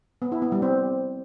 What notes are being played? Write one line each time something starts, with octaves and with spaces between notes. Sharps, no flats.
B3
E4
B3
G3
C4